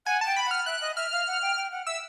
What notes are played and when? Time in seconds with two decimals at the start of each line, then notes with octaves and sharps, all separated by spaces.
0.06 F#5 G#5
0.21 G5 A5
0.36 B5
0.46 F#5 F6
0.66 E5 F#6
0.81 D#5
0.96 E5 F6
1.12 F5
1.27 F#5
1.42 G5
1.57 G5
1.72 F#5
1.87 E5 E6